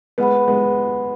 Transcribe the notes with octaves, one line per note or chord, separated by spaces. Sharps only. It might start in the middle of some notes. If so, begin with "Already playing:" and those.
G#3 B3 B4 F#5 B5
G#3 B3